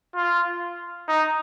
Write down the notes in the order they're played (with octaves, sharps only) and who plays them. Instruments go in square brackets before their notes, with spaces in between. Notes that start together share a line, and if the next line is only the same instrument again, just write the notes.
[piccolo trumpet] F4
D#4